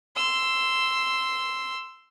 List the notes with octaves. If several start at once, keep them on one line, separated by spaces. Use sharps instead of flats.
C6 E6